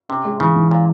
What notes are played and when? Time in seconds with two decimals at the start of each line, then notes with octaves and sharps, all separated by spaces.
0.09 C3 C#4
0.25 G#3
0.40 C#3 E3
0.56 E3
0.71 A#2